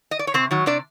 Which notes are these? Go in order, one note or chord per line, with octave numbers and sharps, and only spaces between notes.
D#5
D5
C#5
C3 C4 C5
D#3 F#3
C3 D4 D5